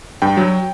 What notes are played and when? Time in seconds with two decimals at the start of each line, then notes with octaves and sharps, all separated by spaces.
0.22 G2 G5
0.37 F#3